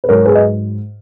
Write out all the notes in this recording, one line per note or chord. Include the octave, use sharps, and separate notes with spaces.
B4
G#2 F#3 A#4 C#5
G#4 B4
D#5